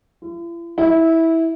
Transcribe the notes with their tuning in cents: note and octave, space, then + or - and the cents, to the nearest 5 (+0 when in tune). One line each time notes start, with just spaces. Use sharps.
E4 +45
E4 -15